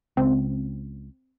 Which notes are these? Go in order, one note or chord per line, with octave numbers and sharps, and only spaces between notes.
C#2 C4